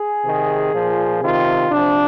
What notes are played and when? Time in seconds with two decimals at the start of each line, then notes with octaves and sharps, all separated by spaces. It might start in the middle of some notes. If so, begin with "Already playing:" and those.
Already playing: G#4
0.24 C3 D#3
0.73 A#2 F3
1.21 C3 D#3 F4
1.71 C3 F3 D4